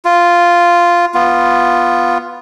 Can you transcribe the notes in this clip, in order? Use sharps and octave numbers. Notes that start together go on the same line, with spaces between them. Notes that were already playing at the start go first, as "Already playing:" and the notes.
F4
B3 F4